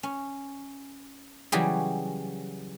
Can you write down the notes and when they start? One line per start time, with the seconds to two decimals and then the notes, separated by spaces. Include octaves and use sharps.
0.03 C#4
1.52 C#3 E3 F#3 G3 G4 G#4